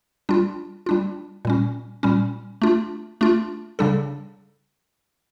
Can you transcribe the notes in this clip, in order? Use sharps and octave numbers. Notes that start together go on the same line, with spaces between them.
G3 D4 F4
G3 D4 F4
A#2 G3 C#4
A#2 G3 C#4
A3 D4 F4
A3 D4 F4
C#3 G3 D4 A4